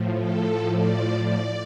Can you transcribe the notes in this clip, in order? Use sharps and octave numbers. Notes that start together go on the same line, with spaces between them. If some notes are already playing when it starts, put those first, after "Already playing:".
Already playing: A2 F3
A4
D5
D5